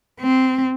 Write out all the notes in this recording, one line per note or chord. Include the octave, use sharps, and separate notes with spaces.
C4